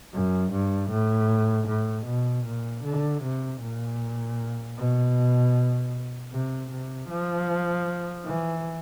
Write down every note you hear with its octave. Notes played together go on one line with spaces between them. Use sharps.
F#2
G2
A2
A2
B2
A#2
D3
C3
A#2
B2
C3
C3
F3
E3